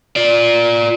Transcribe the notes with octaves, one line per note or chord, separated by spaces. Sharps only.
F4 D5